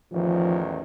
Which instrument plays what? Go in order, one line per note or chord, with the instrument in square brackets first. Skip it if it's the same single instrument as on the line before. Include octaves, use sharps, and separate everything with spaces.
[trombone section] A1 E2 D#3 [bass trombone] F3